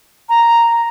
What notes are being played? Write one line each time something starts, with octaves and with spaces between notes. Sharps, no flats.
A#5